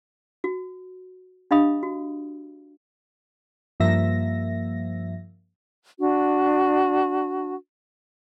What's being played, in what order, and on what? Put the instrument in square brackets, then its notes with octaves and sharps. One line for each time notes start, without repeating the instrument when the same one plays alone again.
[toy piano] F#4
D4 G4 D#5 F5 B5 D#6
F#4
[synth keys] G2 F3 A#3 E5 A#6
[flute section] D4 F#4